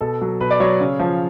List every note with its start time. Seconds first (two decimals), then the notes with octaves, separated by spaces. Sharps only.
0.01 B2 A4
0.21 F#3
0.41 B2 B4
0.50 D5
0.60 F#3 C#5
0.80 C#3
0.99 F3